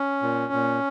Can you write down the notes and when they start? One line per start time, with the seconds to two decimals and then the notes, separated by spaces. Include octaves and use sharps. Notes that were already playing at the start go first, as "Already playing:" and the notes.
Already playing: C#4
0.22 A#2
0.53 A#2